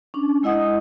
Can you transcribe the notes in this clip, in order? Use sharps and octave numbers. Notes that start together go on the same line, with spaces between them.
C#4 D4
G#3 E4 D#5 F#5 D#6